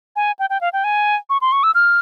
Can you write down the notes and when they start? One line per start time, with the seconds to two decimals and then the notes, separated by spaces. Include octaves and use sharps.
0.16 G#5
0.39 G5
0.50 G5
0.61 F5
0.73 G5
0.84 G#5
1.30 C#6
1.41 C6
1.52 C#6
1.63 E6
1.75 F6